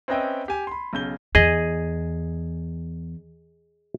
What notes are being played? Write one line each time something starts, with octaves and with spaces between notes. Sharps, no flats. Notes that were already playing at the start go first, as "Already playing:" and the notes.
C4 C#4 B4 D#5 E5 G5
G4 G#5
B5 C6
B1 C#3 G6 G7
E2 G#4 D#5